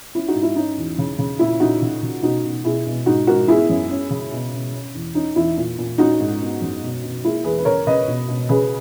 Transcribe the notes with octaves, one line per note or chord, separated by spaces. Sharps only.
C#4 E4
D#4 F#4
G#2
E4
C#4 D#4
E2
C#3
C#3
A#2 E4
A#2 D#4 F#4
C#3
C#3
B2 D#4 F#4
B2
B2 E4 G#4
B2
G#2 D#4 F#4
G#2 F#4 A#4
B3 E4 G#4
F#2
C#4
C#3
B2
B2
C#4
E2
C#4 D#4
E2 E4
A#2
A#2
C#4 D#4 F#4
G#2
B3
F#2
B2
B2
A#3 E4 G#4
E2 G#4 B4
B4
C#3 A#4 C#5
C#3 B4 D#5
B2
B2
C#3 G#4 B4